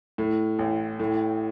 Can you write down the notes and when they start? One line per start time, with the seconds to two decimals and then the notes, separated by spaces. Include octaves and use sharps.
0.18 A2
0.59 A1
1.00 A2